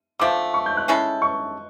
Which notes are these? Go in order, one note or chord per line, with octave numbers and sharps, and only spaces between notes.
D3 F3 A3 D6
C#6
G6
F#6
G#3 C#4 E4 A4
C#6